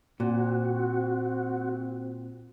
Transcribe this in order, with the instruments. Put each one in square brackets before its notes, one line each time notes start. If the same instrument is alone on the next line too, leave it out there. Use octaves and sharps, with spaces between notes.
[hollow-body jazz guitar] A#2 [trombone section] C4 [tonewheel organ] F#4